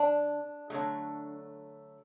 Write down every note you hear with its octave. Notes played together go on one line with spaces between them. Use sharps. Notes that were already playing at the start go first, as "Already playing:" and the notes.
Already playing: D3 D4
D3 F#3 A3